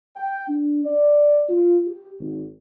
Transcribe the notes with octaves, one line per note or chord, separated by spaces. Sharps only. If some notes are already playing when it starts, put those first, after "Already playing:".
G5
D4
D5
F4
G4
G#1